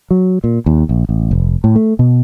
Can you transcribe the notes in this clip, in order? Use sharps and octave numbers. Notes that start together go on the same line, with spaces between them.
F#3
A#2
D#2
A#1
A1
F1
A2
A3
B2